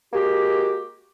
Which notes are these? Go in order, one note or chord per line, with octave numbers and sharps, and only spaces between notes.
G#3 A#3 F#4 G4